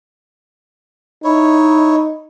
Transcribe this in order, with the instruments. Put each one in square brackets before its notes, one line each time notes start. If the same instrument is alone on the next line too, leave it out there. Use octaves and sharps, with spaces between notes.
[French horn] D#4 [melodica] E4 C#5